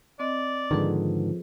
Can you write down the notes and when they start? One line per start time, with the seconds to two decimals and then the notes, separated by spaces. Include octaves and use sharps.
0.20 C4 D5 D#5
0.71 G#2 D3 D#3 F3 G#4 A4 B4